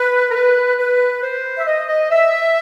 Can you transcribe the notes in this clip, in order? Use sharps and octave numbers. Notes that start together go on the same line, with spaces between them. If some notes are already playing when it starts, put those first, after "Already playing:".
Already playing: B4
A#4
B4
B4
C5
E5
D#5
D#5
E5